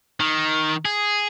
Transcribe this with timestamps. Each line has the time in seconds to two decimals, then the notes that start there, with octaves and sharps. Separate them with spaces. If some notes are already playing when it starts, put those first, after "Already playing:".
0.20 D#3
0.85 G#4